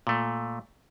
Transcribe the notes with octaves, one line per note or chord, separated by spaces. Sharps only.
A#2 A3